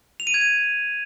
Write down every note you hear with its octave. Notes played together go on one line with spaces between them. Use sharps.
F7
D#7
G#6
D#7